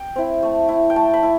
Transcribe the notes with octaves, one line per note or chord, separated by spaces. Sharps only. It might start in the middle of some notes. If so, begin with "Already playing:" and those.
Already playing: G5
C4 E4
A3
E4
G5
A3 A5
B5
E4